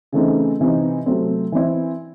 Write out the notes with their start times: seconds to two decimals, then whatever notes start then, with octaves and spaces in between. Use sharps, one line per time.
0.12 C#3 E3 A3 C4 D#4
0.60 C3 E3 C4 D#4
1.06 C3 F#3 A3 C4
1.52 E3 C4 E4